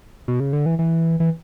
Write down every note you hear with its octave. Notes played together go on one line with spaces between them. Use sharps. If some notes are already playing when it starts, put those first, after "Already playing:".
B2
C#3
D3
E3
E3
E3